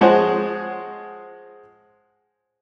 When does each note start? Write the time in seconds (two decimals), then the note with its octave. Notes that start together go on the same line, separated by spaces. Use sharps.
0.01 F3 G#3 F#4 G#4 C5 C#5